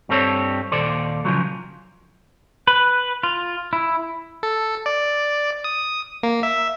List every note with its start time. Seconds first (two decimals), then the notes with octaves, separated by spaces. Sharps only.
0.09 G2 G3 C4 A4 B4 C#5
0.72 D#2 A#2 A4 C5 D5
1.25 C#3 F3 F#3
2.67 B4
3.23 F4
3.73 E4
4.43 A4
4.86 D5
5.64 D#6
6.23 A#3
6.43 E5